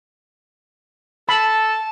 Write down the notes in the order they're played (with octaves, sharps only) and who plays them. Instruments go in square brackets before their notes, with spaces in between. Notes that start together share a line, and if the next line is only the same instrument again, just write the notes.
[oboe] A4 [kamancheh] A5 [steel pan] B5